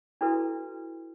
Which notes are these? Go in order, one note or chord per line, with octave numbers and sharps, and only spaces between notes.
D4 E4 F#4 A4 B4